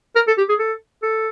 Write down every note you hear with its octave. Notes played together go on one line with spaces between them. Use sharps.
A#4
A4
G4
G#4
A4
A4